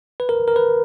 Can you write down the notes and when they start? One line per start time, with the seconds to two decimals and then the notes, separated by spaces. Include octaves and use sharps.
0.20 B4
0.29 A#4
0.48 A#4
0.56 B4